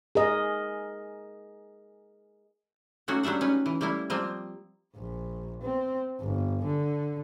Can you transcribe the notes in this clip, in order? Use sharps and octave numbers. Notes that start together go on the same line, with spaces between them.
G#4 A#4 D#5
F#3 A3 A#3 C#4 D#4 F#4
F#3 G3 D4 E5 F#5
C#4 D#4 B4
E3
G3 A3 A#3 E4
F3 G3 A#3 C4
A#1
C4
G1
D3